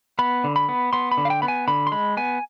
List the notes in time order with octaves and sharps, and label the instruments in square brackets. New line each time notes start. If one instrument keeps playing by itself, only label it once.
[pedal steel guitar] B3 B5
D3
B5
B3
B3 C6
B5
D3
F5
G5
B3 B5
G#5
D3 B5
C6
G#3 B5
B3 G#5